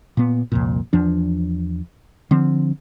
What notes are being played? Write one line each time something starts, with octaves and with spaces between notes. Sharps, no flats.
A#2 B3
C2 F2 A#2
E2 F3 D4
D3 F3 C4